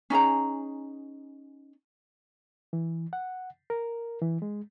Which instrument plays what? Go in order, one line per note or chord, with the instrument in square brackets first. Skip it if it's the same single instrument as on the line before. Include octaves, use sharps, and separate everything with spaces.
[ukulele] C#4 D#4 G#4 A#5
[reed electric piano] E3
F#5
A#4
E3
G#3